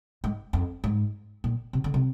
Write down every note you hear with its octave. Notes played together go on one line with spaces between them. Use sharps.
G#2
F2
G#2
A#2
C3
D3
C3